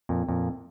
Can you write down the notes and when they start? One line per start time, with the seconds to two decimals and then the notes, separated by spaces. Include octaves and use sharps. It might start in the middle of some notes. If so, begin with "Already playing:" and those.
0.09 F2 A#2
0.28 F2 A#2